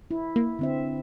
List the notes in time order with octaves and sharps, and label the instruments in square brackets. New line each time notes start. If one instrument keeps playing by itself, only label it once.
[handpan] E4
[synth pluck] A#3
[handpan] D3 C4 E5